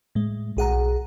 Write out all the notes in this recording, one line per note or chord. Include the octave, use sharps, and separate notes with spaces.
A2 G#3
B1 G#4 F#5 A#5